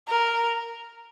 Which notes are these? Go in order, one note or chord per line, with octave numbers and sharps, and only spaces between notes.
A#4